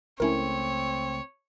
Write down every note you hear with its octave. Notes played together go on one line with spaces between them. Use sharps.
C#2 A3 C4 C#4 E4 A#4 C#5